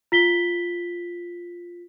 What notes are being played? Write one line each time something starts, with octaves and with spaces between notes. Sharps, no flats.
F4 B6 G7